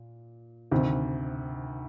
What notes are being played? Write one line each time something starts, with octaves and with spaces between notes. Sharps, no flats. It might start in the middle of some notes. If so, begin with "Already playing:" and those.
Already playing: A#2
D2 C3 D#3